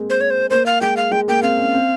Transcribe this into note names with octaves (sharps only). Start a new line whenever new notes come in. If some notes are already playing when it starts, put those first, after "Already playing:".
Already playing: G#3 A#3 C4
C5
C#5
C5
A#3 C5
F5
G#3 G5
F5
G#3 G5
A#3 G5
C4 F5
C#4
C4